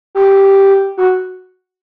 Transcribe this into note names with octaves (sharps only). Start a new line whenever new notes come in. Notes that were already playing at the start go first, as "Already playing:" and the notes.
G4
F#4